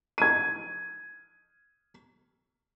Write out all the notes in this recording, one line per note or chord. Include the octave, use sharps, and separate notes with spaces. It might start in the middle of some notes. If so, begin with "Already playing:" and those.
G#6 D#7